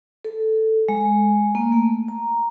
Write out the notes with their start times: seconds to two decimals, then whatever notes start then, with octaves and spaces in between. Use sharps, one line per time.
0.25 A4
0.89 G#3
1.55 A#3
1.72 A3
2.08 A#5